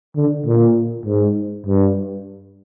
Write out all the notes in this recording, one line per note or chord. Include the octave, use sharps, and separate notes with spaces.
D3
A#2
G#2
G2